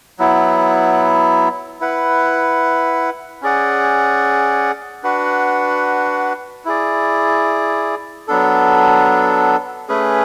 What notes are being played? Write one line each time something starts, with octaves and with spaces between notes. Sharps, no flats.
F#3 B3 E4
E4 B4 F#5
C#4 G#4 D5 F#5
D4 F#4 B4 F#5
E4 G#4 D5
F#3 B3 D4 A4
A3 C#4 G#4 B4